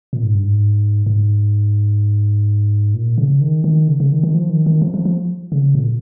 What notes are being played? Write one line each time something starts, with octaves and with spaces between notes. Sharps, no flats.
A#2
G#2
G2
G#2
G#2
A#2
C#3
D#3
D#3
C#3
C#3
D#3
D#3
F3
D#3
D#3
F3
F3
F3
C#3
A#2